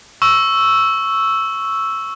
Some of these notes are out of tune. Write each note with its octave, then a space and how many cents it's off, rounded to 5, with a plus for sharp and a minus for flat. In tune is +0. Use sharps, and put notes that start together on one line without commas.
C#6 +0 E6 +0